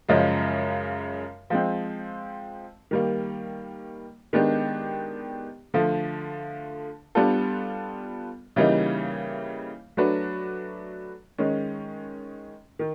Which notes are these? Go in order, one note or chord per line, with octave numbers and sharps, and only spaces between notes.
F#2 C#3 F3 G#3
F3 G#3 C4
D#3 G3 A#3
D#3 G#3 B3 D4 G4
D3 F3 A3
G3 B3 D4 F4 A4
C#3 E3 G3 A#3 D#4
F#3 A3 D4 F#4 B4
D#3 G#3 C#4
D#3